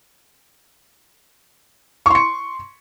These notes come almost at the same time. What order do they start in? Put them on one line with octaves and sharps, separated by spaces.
C#6 C6 C#7